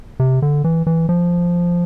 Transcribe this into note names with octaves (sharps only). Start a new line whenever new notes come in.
C3
D3
E3
E3
F3